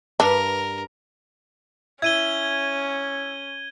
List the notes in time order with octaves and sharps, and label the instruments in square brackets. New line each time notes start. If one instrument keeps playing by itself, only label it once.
[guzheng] G2 B5 [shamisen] D4 [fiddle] A#4
[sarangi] C#4 [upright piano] E4 [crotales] G#6 D#7 G7